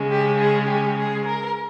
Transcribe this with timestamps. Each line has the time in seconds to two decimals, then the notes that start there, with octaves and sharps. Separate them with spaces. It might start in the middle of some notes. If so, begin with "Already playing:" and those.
Already playing: C#3 G#3 C#4
0.10 G4
0.38 G#4
0.68 G4
0.97 G#4
1.25 A#4